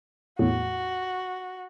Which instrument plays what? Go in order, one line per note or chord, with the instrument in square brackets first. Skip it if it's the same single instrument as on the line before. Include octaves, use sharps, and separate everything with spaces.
[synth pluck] E2 A2 [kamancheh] F#4